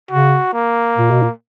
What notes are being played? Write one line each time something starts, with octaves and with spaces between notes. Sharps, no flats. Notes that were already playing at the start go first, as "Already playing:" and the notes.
C#3 F#4
A#3
A#2
B2
A#2